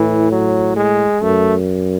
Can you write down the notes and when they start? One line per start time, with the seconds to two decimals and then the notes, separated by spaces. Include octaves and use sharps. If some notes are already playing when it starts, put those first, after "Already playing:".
Already playing: A2 E3
0.31 F#3
0.76 G#3
1.22 F#2 A3